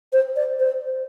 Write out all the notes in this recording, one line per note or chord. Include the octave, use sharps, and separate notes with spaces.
C5
D5
C5